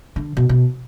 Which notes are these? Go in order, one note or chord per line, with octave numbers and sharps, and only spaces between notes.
D3
B2
B2